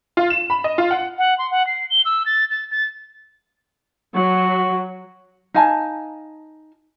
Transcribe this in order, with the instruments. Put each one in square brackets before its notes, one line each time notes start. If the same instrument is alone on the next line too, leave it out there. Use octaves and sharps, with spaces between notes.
[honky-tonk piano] F4
E7
B5
D#5
F4
F#5
[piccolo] F#5
C6
F#5
C7
G7
E6
A6
A6
A6
[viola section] F#3 [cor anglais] F#4
[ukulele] D#4 F5 G#5 A5